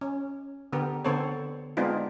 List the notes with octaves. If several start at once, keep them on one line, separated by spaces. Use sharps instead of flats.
C#4
D3 B3 G4 A#4
D3 B3 C4 A4 C5 C#5
G#3 B3 C4 D4 D#4 F4